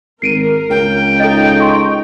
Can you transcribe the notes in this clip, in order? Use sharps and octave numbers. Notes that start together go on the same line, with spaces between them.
G#1 A#4 C7 D7 D#7
C#2 G5
D#4 A4 D#5
C6 C#6